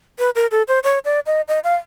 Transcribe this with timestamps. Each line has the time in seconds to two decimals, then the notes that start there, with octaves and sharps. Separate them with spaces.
0.19 B4
0.35 A#4
0.51 A4
0.68 C5
0.84 C#5
1.05 D5
1.26 D#5
1.48 D#5
1.64 F5